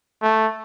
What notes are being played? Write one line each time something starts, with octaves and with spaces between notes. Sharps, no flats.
A3